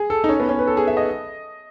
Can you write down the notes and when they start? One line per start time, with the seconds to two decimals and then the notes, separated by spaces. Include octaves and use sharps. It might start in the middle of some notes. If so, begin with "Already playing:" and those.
Already playing: G#4
0.10 A4
0.24 D#4
0.29 C#4
0.40 B3
0.49 C#4
0.59 B4
0.67 A4
0.77 G#4
0.87 E5
0.97 D#5